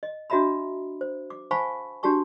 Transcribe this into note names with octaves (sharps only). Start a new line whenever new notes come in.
D#5
D4 F#4 D#5 E5 A#5 B5
C5
D6
C5 F5 G#5 A5 B5 C#6
D4 F#4 G4 A5 C#6